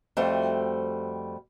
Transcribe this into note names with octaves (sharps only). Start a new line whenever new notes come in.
F2 G3 A3 F#4 C5